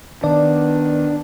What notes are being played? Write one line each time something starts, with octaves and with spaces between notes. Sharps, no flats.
D#3 B3 D4 D5